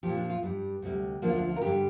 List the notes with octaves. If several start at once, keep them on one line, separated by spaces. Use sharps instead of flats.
A#2 F3 G4
D4
F4
G2 G3
D2 C3 G3
D2 D3 F3 A#3
F4
D4
F4
A#4
G2 D3 G3 G4